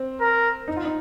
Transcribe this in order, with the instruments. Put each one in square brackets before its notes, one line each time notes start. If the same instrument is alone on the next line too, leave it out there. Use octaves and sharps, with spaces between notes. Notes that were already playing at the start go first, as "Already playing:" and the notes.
Already playing: [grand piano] C4
[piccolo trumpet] A#4
[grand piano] D#4
F4
D#4